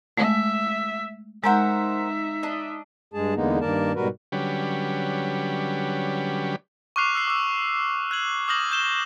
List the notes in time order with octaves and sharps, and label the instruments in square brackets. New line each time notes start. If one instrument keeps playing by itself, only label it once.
[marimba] G#3 A3 [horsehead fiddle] E5
[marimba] G#3 [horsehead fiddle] D#4 E5 [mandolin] A#4 C5 F#5
[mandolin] D4 D#5
[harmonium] G2 G#3 G#4 A5
E2 D3 G#3 A#3 B3 D#4
G2 D#3 A#3 A#4 D5 A5
G#2 B2 G3 F#4 A#4 B4
[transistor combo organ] D3 F#3 G3 C#4 G4 B4
[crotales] C#6 D6 F6 F#6 C7 F7
E6 C7
D6 E6
F#6 G#6 F#7
D6 D#6 F6 G6 A#6 F#7
G6 E7 G7